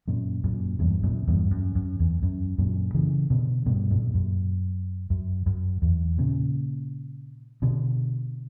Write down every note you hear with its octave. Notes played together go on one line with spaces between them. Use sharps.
F#2 A#2
F#2 A#2
E2 G2
F#2 A#2
E2 G2
F#2
F#2
E2
F#2
F#2 A#2
C#3 E3
B2 D3
G2 B2
F#2 A#2
F#2
F#2
F#2
E2
A#2 C#3
B2 D3